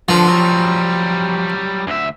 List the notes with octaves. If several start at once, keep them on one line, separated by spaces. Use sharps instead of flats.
G2 D3 F3
F#3 G3
D2 E5